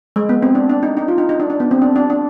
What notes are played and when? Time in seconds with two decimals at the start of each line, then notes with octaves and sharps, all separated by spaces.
0.16 G#3
0.29 B3
0.42 C4
0.55 D4
0.70 D4
0.83 D#4
0.97 D#4
1.08 F4
1.18 D#4
1.29 D#4
1.40 D4
1.50 D4
1.60 B3
1.71 C4
1.82 D4
1.96 D4
2.10 D4